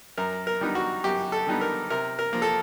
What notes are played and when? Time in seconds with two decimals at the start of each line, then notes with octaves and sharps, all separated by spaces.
0.18 F#2 A#4
0.47 A#4
0.61 D3 G3 B3 D#4
0.75 F#4
1.04 F#2 G4
1.32 A4
1.47 D3 G3 B3 D#4
1.61 A#4
1.90 C3 A#4
2.19 A#4
2.33 F3 A#3
2.42 A4